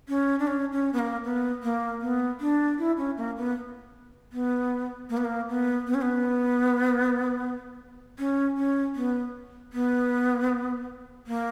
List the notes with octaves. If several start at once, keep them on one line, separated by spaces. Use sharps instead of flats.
C#4
D4
C#4
C#4
B3
A#3
B3
A#3
B3
D4
E4
C#4
A#3
B3
B3
A#3
B3
A#3
B3
B3
C#4
B3
C#4
C#4
B3
B3
A#3